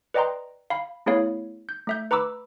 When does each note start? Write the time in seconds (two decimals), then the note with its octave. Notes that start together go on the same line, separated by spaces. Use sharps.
0.14 B4 D5 D#5 G5 A#5 C6
0.70 F5 B5
1.06 A3 B3 E4 G#4 C#5 F5
1.69 G6
1.87 A3 E5 G6
2.11 B4 A#5 B5 D6 E6